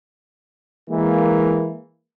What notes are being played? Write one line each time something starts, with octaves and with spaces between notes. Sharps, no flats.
E3 G#3 A#3